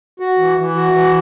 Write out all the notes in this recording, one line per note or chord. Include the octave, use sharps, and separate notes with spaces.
F#4
E3
E3
F#4
E3